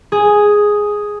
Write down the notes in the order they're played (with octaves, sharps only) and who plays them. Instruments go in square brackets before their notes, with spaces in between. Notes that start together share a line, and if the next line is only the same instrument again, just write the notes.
[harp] G#4